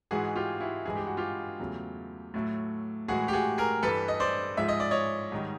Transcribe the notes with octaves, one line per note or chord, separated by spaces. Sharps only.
G#2 E3 G#3 F#4 G#4
F4 G4
E4 F#4
G2 E3 G#3 G#4
G4
F#4
F4 G4
E2 C#3 F#3 A3
A2 F#3 A3
A2 E3 G#3 F#4 G#4
G4
F#4 G#4
G#4 A#4
G2 E3 G3 A4 B4
D#5
C5 D5
G#2 F3 G#3 E5
D#5
D5
C#5 D#5
G#2 D#3 G3